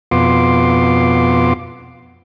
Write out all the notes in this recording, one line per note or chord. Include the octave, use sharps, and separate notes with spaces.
F2 B2 B3 F4 C6 D6